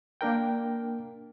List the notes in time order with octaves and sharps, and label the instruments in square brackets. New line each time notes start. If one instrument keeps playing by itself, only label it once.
[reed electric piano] A#3 D4 A#4 G5